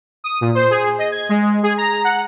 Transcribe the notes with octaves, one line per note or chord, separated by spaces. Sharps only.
D#6
A#2
C5
G#4
D#5
G#6
G#3
G#4
A#5
F#5